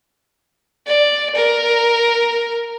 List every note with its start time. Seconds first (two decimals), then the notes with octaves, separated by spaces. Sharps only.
0.87 D5
1.35 A#4